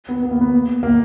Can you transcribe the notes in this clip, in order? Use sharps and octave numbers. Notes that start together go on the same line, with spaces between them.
B3
B3
A#3
B3
A#3